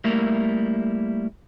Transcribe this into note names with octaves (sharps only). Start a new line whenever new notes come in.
G3 A3 A#3 E4 A#4